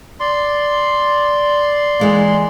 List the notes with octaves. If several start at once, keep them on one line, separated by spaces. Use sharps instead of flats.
D5 C6
E3 G#3 A#3